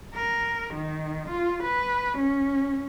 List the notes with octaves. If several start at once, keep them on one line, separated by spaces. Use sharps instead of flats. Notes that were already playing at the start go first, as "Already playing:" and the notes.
A#4
D#3
F4
B4
C#4